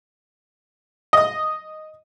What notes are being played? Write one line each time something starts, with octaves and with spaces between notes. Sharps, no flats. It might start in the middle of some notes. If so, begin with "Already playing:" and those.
D#5 D#6